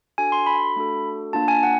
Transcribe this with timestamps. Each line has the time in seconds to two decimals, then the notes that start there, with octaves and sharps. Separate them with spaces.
0.18 D4 F#4 A4 G#5
0.32 C6
0.46 B5
0.76 A3 D4 F#4 A4
1.33 A#3 D4 F4 A5
1.48 G#5
1.63 F#5